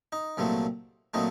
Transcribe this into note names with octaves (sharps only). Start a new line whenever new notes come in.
D#4
C2 A#2 F#3 A3 C4
A#2 F#3 A3 C4 D#4